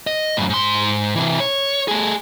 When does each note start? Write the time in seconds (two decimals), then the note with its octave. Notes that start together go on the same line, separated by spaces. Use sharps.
0.07 D#5
0.37 F#2 A2
0.50 G#2 C6
1.15 C3 E3
1.40 C#5
1.88 A3 G#4